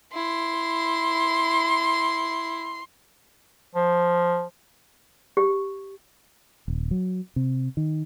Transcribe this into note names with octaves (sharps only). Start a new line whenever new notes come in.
E4 C6
F3
G4
D#1
F#3
C3
D#3